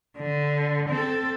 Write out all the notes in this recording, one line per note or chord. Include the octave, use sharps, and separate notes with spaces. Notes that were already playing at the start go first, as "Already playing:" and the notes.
D3
C4 A4